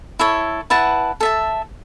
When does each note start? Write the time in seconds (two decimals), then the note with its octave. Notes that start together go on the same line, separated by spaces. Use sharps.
0.19 E4 A4 C#5
0.70 E4 B4 F#5 A5
1.20 A4 E5 A5